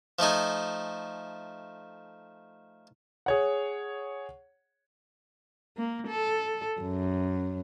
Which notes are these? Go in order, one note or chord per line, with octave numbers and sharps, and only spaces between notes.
F3 A3 D#4 G#5
G#4 C#5 F#5
A#3
A4
F#2